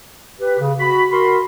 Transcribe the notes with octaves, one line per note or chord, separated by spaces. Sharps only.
G4 B4
C#3
F#4 B5
F#4 A#4 B5 C6